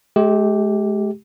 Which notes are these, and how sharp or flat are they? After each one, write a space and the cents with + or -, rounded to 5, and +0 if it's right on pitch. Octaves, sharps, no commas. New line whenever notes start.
G#3 +45 G4 -5